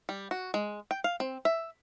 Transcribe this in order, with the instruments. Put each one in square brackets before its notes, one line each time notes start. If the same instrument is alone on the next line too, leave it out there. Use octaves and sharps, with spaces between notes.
[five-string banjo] G3
F#4
G#3
G5
F5
C4
E5